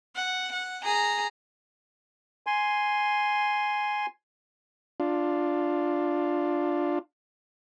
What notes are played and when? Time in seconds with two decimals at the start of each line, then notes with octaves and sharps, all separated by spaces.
0.16 F#5
0.53 F#5
0.83 G#4 A#5
2.47 G#5 C6
5.00 D4 F4